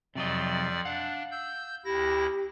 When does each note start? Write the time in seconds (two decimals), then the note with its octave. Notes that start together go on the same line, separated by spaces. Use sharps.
0.15 F2 C3 F3 F#3 D5 D#5
0.85 D4 F5 F#5
1.31 E6 G6
1.85 D2 E4 G4 A#6